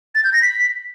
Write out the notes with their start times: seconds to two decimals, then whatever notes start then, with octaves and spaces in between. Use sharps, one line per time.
0.15 A6
0.24 G6
0.33 A#6
0.42 B6